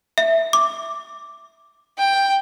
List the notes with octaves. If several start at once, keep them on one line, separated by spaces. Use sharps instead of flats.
E5
D6
G5